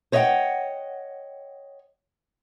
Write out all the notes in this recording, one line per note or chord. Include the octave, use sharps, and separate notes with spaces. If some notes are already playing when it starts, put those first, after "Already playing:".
C5 C#5 D#5 E5 F#5 G5